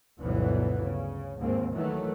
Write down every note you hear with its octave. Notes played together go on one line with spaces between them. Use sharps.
G1 D2 B2 E3 F#3 B3
C#3
D#2 G#2 A#3 C4
D#3 E3 F#3 A3